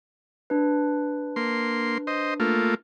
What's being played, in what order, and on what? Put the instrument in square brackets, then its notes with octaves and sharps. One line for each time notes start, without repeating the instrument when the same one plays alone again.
[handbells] D4 B4
[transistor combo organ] A#3 C6
C5 D#5
A3 A#3 F4